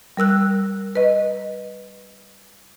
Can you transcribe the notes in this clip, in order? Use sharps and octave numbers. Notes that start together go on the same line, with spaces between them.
G3 A#4 E6 F#6
B4 D#5